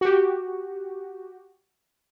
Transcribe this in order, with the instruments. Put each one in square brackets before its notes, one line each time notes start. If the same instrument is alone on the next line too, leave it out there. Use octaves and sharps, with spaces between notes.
[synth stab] F#4 G4